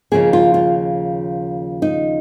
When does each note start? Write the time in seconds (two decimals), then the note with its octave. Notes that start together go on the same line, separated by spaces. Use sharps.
0.12 D#2 C#3 F3 A#3 G#4
0.33 F4
0.54 F4
1.82 D#4